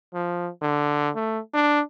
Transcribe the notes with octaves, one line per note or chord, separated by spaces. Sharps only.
F3
D3
A3
D4